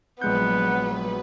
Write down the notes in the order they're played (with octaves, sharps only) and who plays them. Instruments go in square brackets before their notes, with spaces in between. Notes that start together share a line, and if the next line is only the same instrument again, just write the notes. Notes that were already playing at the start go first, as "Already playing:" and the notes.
[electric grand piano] A#1 G#3 G6 [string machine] F#3 B4 [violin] B3 [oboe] F#5